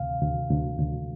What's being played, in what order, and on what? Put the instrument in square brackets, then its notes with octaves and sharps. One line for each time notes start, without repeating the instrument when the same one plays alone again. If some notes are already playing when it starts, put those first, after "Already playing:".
Already playing: [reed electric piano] D2 C3 F5
D2
D2
D2